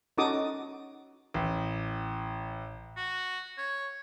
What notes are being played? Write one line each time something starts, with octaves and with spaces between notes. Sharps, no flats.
C#4 D#4 F#4 A4 D6 D#6
A1
F#4
C#5